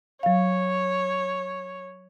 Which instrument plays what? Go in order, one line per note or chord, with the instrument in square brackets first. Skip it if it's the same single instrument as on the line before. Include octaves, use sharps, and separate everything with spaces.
[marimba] F#3 F5 [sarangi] C#5